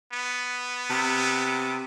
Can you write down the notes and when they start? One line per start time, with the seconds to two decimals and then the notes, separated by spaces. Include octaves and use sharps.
0.12 B3
0.90 C3